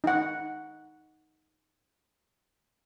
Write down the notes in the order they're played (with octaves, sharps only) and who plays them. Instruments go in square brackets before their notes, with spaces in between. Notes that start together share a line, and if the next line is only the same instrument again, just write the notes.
[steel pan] D#4 F#5